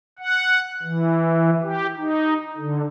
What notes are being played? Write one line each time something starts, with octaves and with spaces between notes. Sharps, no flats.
F#5
E3
G4
D#4
D3